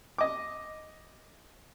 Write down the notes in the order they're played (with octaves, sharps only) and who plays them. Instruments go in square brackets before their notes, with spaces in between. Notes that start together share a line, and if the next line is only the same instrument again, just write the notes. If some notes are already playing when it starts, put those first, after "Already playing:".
[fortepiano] D#5 D6